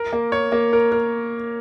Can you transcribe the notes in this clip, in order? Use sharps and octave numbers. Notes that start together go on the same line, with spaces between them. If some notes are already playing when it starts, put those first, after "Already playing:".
Already playing: A#4
A#3
C#5
A#3
A#4
A#4